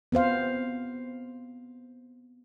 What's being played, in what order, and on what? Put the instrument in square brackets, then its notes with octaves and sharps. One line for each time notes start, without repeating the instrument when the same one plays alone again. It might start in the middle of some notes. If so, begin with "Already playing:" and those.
[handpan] B3 C4 C5 F5